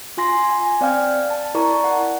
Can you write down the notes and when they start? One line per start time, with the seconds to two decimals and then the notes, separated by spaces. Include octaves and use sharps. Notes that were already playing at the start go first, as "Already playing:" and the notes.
0.17 F4 G#5 C6 A#6
0.51 G#5
0.81 C4 D5 F5 G5 F6
1.30 A5
1.54 E4 A#4 D5 A5 A#5 C#6
1.84 F#5